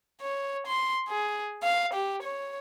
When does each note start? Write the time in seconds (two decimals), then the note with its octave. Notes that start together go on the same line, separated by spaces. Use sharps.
0.22 C#5
0.67 C6
1.08 G#4
1.63 F5
1.94 G4
2.23 C#5